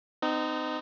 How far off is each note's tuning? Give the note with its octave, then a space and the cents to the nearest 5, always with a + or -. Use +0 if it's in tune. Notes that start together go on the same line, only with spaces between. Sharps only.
C4 -45 D#4 -15